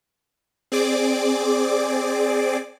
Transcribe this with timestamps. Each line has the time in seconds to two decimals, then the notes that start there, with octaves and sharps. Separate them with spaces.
0.72 C4 G#4 D5 D6